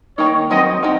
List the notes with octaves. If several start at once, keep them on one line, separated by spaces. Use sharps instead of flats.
D#3 A#3 D#4 C#5
D#3 F#3 C4 D#4 D#5
D#3 F#3 C4 D#4